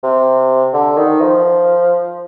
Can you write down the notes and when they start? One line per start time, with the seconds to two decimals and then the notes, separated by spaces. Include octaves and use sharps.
0.03 C3
0.73 D3
0.97 D#3
1.21 F3